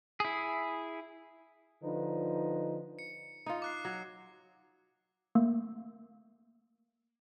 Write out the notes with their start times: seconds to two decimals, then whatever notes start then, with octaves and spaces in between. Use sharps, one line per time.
0.20 E4 G#4
1.83 D3 F3 D#4 B4
2.99 C#7
3.46 D#4 F4
3.62 D6 F#6 C7
3.85 F#3
5.35 A3 A#3